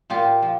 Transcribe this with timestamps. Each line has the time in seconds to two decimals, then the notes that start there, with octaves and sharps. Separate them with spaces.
0.10 A#2 F4 G4
0.42 F3